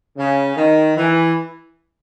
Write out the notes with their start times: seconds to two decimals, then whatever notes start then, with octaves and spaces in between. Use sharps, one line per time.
0.17 C#3
0.56 D#3
0.96 E3